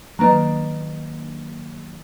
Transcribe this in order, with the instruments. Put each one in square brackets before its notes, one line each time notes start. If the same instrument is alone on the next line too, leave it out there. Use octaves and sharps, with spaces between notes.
[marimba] D#3 B4 A#5 [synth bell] F#3 A#3 D4